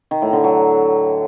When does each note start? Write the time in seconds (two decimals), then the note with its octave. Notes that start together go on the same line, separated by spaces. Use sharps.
0.11 D#3
0.22 A2
0.33 D3
0.44 F#3